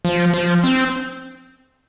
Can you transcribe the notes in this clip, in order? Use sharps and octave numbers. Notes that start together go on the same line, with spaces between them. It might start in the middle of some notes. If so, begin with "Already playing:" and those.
F3
F3
C4